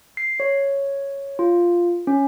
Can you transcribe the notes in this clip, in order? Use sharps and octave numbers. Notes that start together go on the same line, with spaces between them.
C7
C#5
F4
C#4